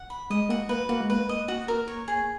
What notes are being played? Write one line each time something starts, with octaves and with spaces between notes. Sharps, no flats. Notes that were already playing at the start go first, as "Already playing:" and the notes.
Already playing: F#5
B5
G#3 D#5
A#3 F#4
A#3 B4
A#3 F#4
G#3
A#3 B4
D#5
F#4
A#4
C#5
G#4